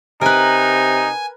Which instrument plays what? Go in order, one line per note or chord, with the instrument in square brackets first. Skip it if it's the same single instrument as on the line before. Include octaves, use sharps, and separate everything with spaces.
[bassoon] C3 [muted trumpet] D#4 [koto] A#4 B4 [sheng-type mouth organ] G#5